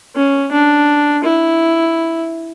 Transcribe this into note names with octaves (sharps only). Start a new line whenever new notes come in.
C#4
D4
E4